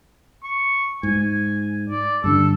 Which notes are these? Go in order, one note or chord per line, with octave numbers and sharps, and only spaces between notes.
C#6
G#2 G#5
D5
G2 D3 D4 A4